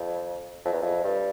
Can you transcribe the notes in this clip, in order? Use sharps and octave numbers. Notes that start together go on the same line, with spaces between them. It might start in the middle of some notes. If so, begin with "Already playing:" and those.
Already playing: F2
F2
E2
F2
G2